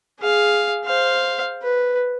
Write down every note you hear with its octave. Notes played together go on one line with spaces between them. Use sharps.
G#4 F5
C5 F5
B4